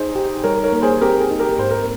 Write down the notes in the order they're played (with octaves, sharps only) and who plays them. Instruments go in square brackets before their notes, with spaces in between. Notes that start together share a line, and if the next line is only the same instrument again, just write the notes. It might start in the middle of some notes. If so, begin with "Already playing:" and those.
Already playing: [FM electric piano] D#4 [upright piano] G#4 C5
[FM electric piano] G4
[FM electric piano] G3 [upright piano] A#4 C#5
[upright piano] A#4 C#5
[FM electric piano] A#3
[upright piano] G#4 C5
[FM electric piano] C4 [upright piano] G4 A#4
[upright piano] G#4
[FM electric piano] D#4
[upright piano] G4 A#4
[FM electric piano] G#2 [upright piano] C5
[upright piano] A#4